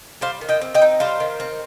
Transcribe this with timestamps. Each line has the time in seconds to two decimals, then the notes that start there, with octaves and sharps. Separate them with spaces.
0.21 G3 C5 F5
0.41 D#3
0.49 D#5 G5
0.61 C4
0.75 D#5 G5
0.82 D#4
1.00 G3 C5 F5
1.20 D#3
1.40 C4